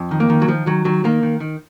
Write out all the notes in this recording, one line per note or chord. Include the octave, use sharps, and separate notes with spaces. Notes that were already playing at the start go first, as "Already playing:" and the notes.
Already playing: F2
D#3
A#3
D#3
F#3
D#3 F3
D#3 F#3
D#3 F#3
D#3 A#3
D#3
D#3